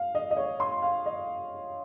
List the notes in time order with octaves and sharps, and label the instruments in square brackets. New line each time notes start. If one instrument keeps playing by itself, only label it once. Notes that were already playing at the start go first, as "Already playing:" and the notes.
Already playing: [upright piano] F5
D#5
D#5
C#5
C6
F5
D#5